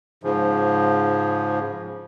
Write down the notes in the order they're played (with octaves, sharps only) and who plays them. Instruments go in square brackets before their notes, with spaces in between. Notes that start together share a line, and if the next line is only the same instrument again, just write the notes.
[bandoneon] G#2 C#3 F3